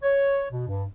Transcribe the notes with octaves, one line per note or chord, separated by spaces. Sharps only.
C#5
B2
G2